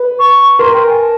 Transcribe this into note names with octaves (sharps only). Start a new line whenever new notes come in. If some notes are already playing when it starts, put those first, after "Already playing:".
Already playing: B4
C#6
A#4 C6
G5
G#5
A5